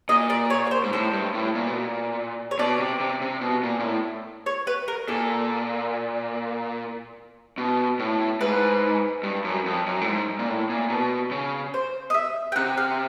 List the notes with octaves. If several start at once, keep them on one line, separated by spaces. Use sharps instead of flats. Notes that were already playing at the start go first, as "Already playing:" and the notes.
A#2 D#5
D5
C#5
C#5
C5
G#2
A2 C5
G2
A2
A#2
B2
A#2
C#5
B2 D5
C3
C3
C3
B2
A#2
A#2
A2
C#5
B4
A#4
A#2 A4
B2
A2
G#2 B4
G2
F#2
F2
F#2
A2
G#2
A#2
A2
A#2
B2
C#3
C5
D#5
E5
G5
C3 F#5
F5